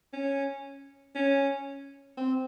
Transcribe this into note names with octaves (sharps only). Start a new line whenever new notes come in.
C#4
C#4
C4